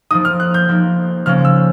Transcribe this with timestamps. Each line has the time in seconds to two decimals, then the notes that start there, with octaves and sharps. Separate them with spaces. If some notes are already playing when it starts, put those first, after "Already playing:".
0.11 F3 A#3 D#4 D#6
0.25 F6
0.40 F#6
0.54 G6
0.69 F3 A#3 D#4
1.26 C#3 F3 A#3 C#4 F6
1.45 E6